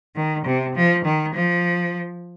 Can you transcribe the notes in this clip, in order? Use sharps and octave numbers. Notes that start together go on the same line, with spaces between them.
D#3
C3
F3
D#3
F3